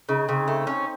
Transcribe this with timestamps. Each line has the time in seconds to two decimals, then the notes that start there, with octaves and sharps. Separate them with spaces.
0.09 C#3 D#4
0.28 C#3 C4
0.48 A3
0.67 C#4